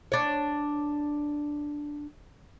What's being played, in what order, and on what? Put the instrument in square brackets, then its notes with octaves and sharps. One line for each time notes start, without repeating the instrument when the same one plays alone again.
[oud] D4 C#5